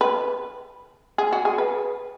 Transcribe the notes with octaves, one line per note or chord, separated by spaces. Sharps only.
B4
G#4
F#4
G#4
B4